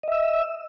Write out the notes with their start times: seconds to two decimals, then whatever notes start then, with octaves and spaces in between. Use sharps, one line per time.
0.03 D#5
0.08 E5
0.12 E6